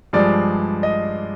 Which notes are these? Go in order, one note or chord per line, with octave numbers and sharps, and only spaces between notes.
G2 F3 G#3 D5
D#5